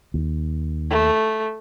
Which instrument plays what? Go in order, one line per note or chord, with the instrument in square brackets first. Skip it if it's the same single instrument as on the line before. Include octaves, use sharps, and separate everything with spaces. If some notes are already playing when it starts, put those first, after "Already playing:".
[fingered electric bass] D#2
[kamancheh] A3